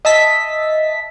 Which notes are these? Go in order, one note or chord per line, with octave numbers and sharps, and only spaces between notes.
D#5 E5 A5 B6